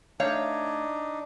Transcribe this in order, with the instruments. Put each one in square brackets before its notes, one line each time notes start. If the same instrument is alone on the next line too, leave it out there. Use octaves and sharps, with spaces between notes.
[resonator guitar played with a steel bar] A3 C#5 F5 [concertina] D4 D#4